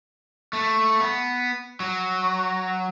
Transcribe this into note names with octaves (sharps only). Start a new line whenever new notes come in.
A3
B3
F#3